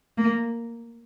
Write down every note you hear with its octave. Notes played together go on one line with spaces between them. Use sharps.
A#3